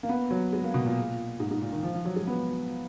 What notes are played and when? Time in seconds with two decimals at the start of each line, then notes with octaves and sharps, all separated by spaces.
0.03 A#3
0.09 B3
0.31 F#3
0.53 G#3
0.64 A#3
0.74 B2
0.86 A#2
1.40 G#2
1.51 G#2
1.62 A#2
1.72 D#3
1.83 F3
1.94 F3
2.05 F#3
2.16 G#3
2.27 B3